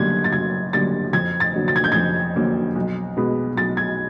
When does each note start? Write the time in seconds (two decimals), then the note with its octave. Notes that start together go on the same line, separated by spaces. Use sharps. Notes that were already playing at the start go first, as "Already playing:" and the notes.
Already playing: F#1 F#2 D3 G3 A#3 G#6
0.24 A6
0.32 F#1 G#6
0.73 F#2 D3 G3 A#3 A6
1.13 F2 G#6
1.40 A6
1.54 D3 F#3 A#3
1.68 A6
1.76 G#6
1.84 G6
1.92 F2 G#6
2.35 D3 F#3 A#3
2.76 B1
3.17 B2 G#3 B3
3.57 B1 A6
3.77 G#6